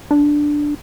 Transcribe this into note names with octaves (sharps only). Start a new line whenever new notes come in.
D4